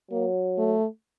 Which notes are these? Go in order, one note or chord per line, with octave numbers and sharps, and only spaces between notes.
F#3 A#3
A3